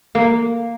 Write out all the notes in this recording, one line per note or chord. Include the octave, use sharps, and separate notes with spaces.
A#3